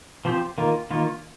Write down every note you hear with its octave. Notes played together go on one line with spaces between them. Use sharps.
F3 C4 G4 C5
D#3 A#3 F4
D#3 A#3 F4